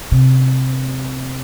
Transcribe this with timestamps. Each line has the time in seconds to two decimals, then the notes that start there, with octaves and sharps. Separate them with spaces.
0.12 C3